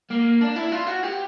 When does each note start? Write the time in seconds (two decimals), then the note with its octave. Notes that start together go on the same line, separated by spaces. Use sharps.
0.11 A#3
0.41 D4
0.56 E4
0.72 F4
0.87 F#4
1.03 G4